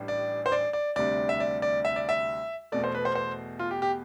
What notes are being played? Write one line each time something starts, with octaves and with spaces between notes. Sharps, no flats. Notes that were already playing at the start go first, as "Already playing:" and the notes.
Already playing: A1 A2 G3 D4
D5
C5
D5
D5
D2 C3 G3 D4 D5
E5
D5
D5
E5
D5
E5
E2 B2 A3 D5
C5
B4
C5
C5
F4
G4
G4